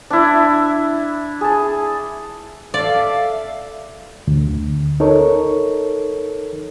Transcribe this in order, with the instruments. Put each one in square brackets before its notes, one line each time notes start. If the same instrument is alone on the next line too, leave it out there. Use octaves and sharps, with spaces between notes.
[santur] D4 E4
G#4 A5
[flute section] A4 E5 F5 [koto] D5
[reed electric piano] D2
D#4 A4 A#4 C#5